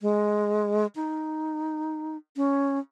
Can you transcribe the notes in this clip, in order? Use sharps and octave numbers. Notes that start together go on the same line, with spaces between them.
G#3
D#4
C#4